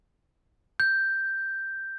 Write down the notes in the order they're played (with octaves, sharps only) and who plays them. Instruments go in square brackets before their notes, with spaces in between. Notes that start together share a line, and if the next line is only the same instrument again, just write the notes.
[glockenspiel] G6